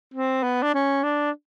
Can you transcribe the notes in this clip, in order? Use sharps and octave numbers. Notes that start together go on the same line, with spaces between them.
C4
B3
D4
C#4
D4